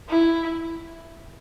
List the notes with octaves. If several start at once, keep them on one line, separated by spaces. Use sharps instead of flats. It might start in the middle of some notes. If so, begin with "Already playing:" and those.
E4